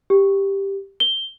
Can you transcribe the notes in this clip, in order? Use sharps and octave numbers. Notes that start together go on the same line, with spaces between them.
G4
G7